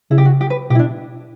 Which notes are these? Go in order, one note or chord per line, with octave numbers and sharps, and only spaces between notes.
C#3 E4
G4
F#4
G4
B4
B2 G4
E4
D4